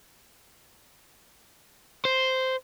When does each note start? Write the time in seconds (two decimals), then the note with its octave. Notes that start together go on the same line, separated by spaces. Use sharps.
2.05 C5